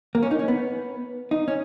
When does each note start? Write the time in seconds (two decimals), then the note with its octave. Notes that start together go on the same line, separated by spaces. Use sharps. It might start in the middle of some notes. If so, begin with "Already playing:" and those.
0.15 A#3
0.23 C#4
0.31 D#4
0.39 C#4
0.48 B3
1.31 D#4
1.48 C#4